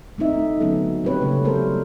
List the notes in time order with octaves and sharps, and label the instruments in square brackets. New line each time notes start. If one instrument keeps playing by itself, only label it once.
[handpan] A3 C4 D#4 E5
D3 F#3 A3 B3 C#4 A4
G3 C4 G4 B4 C#5
C#3 A3 A#3 G4
F#3 G3 B3 A4 A#4 C5